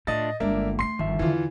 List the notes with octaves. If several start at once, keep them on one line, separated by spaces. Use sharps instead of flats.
A2 A3 D4 F4 D#5 A6
G1 G#3 A#3 D4 A#4 E5
G#3 A3 C6 C7
G1 D#3 F3 E5
E2 D3 E3 F4